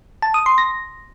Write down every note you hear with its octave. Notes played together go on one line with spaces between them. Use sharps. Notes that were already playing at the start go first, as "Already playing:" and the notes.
A5
D#6
C6
A#6